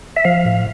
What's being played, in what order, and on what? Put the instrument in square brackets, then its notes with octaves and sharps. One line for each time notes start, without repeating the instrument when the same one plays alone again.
[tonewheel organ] E5
F3 F5
A2